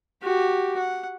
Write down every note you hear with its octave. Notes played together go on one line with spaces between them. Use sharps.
F#4 G4
F#5